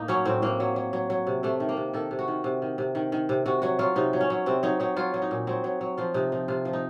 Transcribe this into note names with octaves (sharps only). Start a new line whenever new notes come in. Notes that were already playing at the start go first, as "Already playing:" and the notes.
Already playing: A2 A#3 D#4
F#3 C#4
A2 C4
A2 A#3
F#3
F#3
F#3
F#3
C3
C3 A3
D#3
A#3
C3
D#3 A4
C3
F#4
D#3
C3
D#3
C3
D#3
D#3
C3
C3 F#4
F#3 F#4
F#3 F4
C3 D#4
F#3
C#4
F#3
C3 C4
F#3 D#4
F#3 D#4
F#3 F4
F#3
D#4
A#2
F#3 C4
F#3
F#3
F3 F4
C3 D#4
F3 D#4
C3 F4
F3
D#4